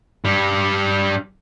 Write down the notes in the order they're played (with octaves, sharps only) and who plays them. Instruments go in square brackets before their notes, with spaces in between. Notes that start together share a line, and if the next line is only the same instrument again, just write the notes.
[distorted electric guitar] G2 G3